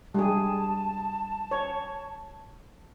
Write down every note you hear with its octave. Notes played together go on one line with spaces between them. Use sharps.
G3 G#4 A5
C#5